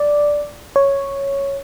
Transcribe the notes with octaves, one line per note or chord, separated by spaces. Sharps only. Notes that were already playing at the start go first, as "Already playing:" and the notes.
Already playing: D5
C#5